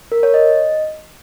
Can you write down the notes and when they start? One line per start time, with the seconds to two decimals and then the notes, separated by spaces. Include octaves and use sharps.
0.12 A#4
0.23 C#5
0.34 D#5